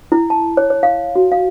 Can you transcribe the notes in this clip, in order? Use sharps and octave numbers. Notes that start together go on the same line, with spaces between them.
E4
A5
C#5
C#5
F5
F#4
F5